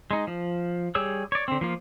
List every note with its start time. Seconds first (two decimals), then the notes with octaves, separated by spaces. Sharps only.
0.11 G#3 D#4
0.27 F3
0.95 G3 G4 G#4 C#5 E6
1.32 C#5 D5
1.48 D3 C4
1.61 F3 A#3 F4